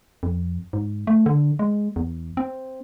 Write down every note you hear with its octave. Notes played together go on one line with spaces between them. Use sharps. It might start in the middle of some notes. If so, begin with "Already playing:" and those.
F2
G#2
A3
D3
G#3
E2
C4